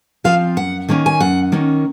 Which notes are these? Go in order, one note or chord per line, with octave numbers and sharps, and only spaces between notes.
F3 C4 F4 F5
F#2 F#5
D#3 A#3 C#4
G#5
F#2 F#5
D#3 A#3 C#4